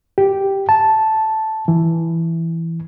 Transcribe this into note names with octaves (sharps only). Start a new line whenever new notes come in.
G4
A5
E3